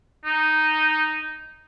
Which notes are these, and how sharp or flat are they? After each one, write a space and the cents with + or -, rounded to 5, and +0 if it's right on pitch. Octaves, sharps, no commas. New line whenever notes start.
D#4 -5